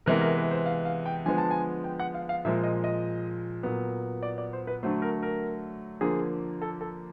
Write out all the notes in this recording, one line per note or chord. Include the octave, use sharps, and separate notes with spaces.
C3 E3 G#3 B3 A#4
A#4
B4
C5
F5
F5
G5
D3 F3 G#3 B3 G#5
A5
G#5
G5
F#5
F5
F5
A#2 F3 G#3 E5
D#5
D#5
A#2 F#3 B3
D5
D5
C5
B4
D3 F#3 A3 C5
A#4
A#4
D3 F3 A#3 G#4
A4
A4